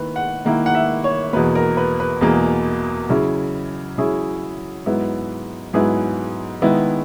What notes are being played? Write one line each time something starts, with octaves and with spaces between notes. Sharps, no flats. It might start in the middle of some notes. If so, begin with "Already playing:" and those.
Already playing: D#3 A#3 E4 B4
F#5
D#3 A#3 E4 F#5
F#5
E5
C#5
E2 B2 A#3 B4
A#4
B4
B4
E2 B2 A#3 G#4
C#3 F#3 C#4 E4
C#3 F#3 C#4 E4 G#4
G#2 F#3 B3 E4
G#2 F#3 B3 E4 G#4
D#3 G#3 B3 E4